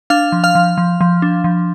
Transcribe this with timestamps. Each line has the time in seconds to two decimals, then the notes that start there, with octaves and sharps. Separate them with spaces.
0.10 D4 F5 F6
0.32 F3
0.44 F5 F6
0.55 F3
0.78 F3
1.01 F3
1.22 D4
1.44 F3